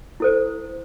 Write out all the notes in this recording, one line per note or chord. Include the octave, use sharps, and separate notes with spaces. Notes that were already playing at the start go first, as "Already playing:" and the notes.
E4 A4 C5